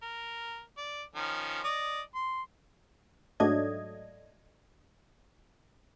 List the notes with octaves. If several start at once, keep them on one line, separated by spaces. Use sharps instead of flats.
A#4
D5
D#3 F3 C#4
D5 D#5
C6
G#2 F#3 A3 D4 D#5 G#6